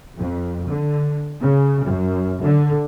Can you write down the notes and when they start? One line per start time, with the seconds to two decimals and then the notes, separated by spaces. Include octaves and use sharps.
0.19 F2
0.68 D3
1.41 C#3
1.88 F#2
2.44 D3